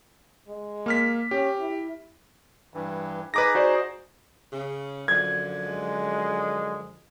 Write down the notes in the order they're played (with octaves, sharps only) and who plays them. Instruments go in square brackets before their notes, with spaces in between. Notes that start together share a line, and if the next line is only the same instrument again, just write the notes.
[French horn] G#3
[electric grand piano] A#3 F6 B6
[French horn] C#4 [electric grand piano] G4
[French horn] E4
[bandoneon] G2 E3
[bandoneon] D#4 G#4 [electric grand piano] B4 D6 A#6
[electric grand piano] F#4 C5 D5
[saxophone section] C#3
[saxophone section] F#2 D3 F3 [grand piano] G#6
[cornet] G#3